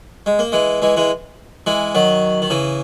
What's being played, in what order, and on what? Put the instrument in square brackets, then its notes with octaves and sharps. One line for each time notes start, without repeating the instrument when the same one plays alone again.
[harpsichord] G#3
A#3
E3 G#3
E3 G#3
E3 G#3
E3 G#3
D#3 F#3
D#3
C#3 E3